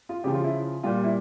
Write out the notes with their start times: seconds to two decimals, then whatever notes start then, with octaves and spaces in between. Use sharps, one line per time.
0.09 F4
0.24 C#3 F3 G4
0.34 F4
0.44 E4
0.83 A#2 G3 F4
1.04 E4